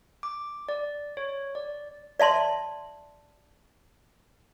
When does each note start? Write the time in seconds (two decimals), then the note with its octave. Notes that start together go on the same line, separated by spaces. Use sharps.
0.23 D6
0.69 D5
1.17 C#5
1.55 D5
2.20 D5 E5 A5 C6